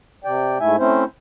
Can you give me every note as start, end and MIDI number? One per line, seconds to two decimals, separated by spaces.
0.24 0.58 48
0.24 0.58 74
0.24 0.58 79
0.60 0.76 44
0.60 0.76 57
0.60 0.76 64
0.60 0.76 76
0.60 0.76 80
0.78 1.04 57
0.78 1.04 60
0.78 1.04 61
0.78 1.04 64
0.78 1.04 72